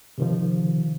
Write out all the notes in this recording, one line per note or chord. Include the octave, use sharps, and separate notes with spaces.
C3 D#3 F3